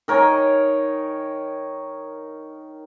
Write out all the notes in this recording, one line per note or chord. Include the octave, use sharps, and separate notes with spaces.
D#3 A#4 C#5 G#5